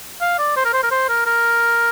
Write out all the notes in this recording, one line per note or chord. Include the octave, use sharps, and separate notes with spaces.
F5
D5
C5
A#4
C5
A#4
C5
A#4
A#4